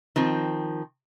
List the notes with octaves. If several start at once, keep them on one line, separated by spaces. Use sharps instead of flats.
D#3 F3 C4